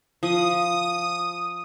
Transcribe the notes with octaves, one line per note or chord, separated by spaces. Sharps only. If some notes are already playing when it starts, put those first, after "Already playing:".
F3 D#6